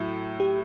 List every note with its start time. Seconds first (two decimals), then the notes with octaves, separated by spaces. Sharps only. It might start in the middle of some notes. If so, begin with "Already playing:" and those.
Already playing: A2 F#3 A3 E4
0.40 G4